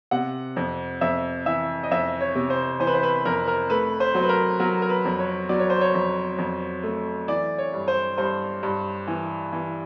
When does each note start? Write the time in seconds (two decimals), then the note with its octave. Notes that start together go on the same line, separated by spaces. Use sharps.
0.11 C3 F#5
0.56 F2
1.01 F2 E5
1.46 E3 E5
1.83 D#5
1.91 F2 E5
2.21 C#5
2.35 C3
2.50 C5
2.80 E3 C5
2.87 B4
2.95 C5
3.03 B4
3.25 F2 A#4
3.48 A#4
3.70 A3 B4
4.00 C5
4.14 F#3 C5
4.23 B4
4.29 A#4
4.60 F#3 A#4
4.82 A#4
4.89 B4
5.05 F2
5.19 C#5
5.49 F#3 D5
5.60 C#5
5.70 C5
5.81 C#5
5.94 F2
6.38 F2
6.83 A3
7.28 E3 D5
7.58 C#5
7.74 G2
7.88 C5
8.18 G2 C5
8.63 G2
9.07 E3
9.53 E3